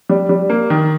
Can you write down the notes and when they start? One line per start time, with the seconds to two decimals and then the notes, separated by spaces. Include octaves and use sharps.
0.09 G3
0.29 G3
0.50 A#3
0.70 D#3